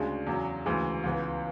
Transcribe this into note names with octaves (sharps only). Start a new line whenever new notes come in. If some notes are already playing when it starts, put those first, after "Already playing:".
Already playing: D2 C#3 G#3 D4
E2 C#3 F#3
D2 C#3 E3 G#3
C#2 C#3 E3 B3